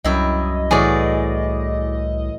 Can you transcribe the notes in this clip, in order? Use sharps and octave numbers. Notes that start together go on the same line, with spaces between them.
C2 F#2 E4 D#5 G5
A2 E3 F#4 G#4 D5